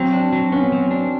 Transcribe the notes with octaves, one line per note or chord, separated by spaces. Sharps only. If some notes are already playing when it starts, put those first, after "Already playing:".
Already playing: F#3 C4
D4
F#3
B3 C#4
F#3
D4